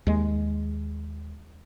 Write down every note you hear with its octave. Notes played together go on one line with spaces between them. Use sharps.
D#2 G#3